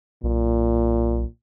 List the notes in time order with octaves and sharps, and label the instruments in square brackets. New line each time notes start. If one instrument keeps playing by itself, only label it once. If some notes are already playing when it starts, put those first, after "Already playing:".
[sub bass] B1 [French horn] A#2